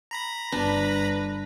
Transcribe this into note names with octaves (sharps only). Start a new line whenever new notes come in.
A#5 B5 A#6
G1 D4 B4